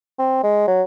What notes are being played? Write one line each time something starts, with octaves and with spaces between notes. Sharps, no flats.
C4
G#3
F#3